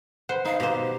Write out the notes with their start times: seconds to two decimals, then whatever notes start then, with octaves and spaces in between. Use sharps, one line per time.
0.29 B4 C5 F#5
0.46 D#4 F5
0.60 B2 G4 C5